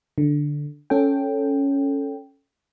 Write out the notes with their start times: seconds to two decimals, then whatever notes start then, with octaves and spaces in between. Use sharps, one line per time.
0.18 D3
0.90 C#4 A4 G5